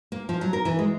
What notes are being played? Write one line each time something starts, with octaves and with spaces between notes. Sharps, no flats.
A#3
F3
F#3
A#4
E3
G#3